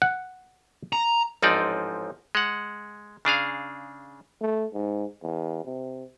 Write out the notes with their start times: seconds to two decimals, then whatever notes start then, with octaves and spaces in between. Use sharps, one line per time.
0.02 F#5
0.93 A#5
1.42 A1 G#2 F3 C4 D#4 D5
2.35 G#3 F#5
3.25 C#3 D4 G#4 F5
4.41 A3
4.73 G#2
5.22 E2
5.65 C3